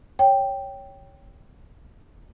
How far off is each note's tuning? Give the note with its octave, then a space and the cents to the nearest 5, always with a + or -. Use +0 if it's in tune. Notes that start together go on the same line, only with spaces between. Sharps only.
C#5 +0 G5 +0